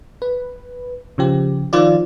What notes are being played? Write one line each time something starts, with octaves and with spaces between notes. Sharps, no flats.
B4
C#3 F3 G4
D#3 F3 F4 D5